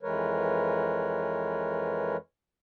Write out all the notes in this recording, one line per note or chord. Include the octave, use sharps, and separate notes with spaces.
F2 E3 G#3 A#4 B4 C#5